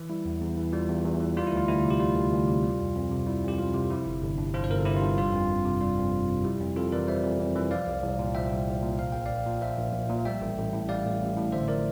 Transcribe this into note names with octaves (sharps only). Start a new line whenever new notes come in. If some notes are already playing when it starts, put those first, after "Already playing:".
Already playing: E3
G3 E4
E2
E2
E3
G3 F4
E2
E2
E3
G3 F4
E4
D2
F4
D2 E4
C3
G4
G3 F4
D2
D2
C3
G3
F2
F2
C3
G3 E4
F2 G4
F2 F4
C3
F3 E4
G1
G1
G2
F3 F4
C5
G1 A#4
A4
G1 E4 G4
F4
G2
G3 F4
F2
F2
C3
G3 F4
F2
F2
C3
G3 E4 G4
F2
F2 F4 A4
E3 A#4 D5
G3 C5 E5
F2
F2
E3
F3 D5 F5
C2
C2
A#2
F3 E5 G5
C2
C2
A#2
F3 F5
A#1 G5
A#1 D5 F5
A#2
F3 C5 E5
A#1
A#1
A#2
G3 E5 G5
A1
A1
A2
G3 D5 F5
A1
A1
A2
D3 C5 E5
F3 A#4 D5